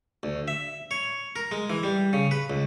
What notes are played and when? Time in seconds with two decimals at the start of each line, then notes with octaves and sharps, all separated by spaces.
0.23 D2
0.48 E5
0.91 C#5
1.36 A#4
1.51 G#3
1.70 E3
1.83 G3
2.13 C#3
2.31 B4
2.50 C#2